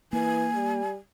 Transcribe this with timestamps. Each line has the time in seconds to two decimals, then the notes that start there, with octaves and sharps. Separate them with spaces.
0.13 E3 A#3 G#5
0.55 G3